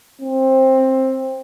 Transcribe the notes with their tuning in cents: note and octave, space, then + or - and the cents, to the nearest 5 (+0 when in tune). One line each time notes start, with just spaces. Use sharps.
C4 +15